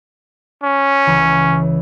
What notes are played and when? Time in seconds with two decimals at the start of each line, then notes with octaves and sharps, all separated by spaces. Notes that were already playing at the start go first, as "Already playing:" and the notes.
0.63 C#4
1.06 C#2 E3